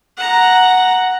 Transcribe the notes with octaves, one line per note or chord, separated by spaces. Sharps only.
F#5 A#5